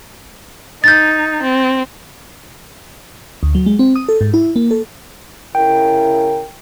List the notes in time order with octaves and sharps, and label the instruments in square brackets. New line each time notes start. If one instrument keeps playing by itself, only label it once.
[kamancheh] D#4 [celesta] G6 A6
[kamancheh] C4
[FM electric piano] D2
F#3
G#3
C4
D#6
A4
G#2
E4
A#3
A4
[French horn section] C#3 E4 A#4 [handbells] G5